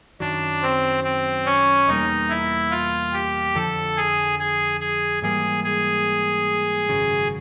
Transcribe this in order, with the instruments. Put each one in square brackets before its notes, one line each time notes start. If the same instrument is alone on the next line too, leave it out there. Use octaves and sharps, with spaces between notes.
[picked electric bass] F#2 D#3 F#3 [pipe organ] D4
[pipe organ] C4
C4
C#4
[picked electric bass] E2 B2 G3 A#3 [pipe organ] D#4
[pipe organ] E4
F4
G4
[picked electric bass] F2 D3 F3 [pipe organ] A4
[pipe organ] G#4
G#4
G#4
[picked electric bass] G#2 E3 G3 A#3 [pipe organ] G#4
[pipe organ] G#4
[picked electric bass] G#1 F#2 C#3